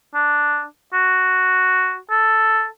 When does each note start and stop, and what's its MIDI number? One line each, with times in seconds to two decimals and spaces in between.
0.14 0.64 62
0.93 1.97 66
2.10 2.66 69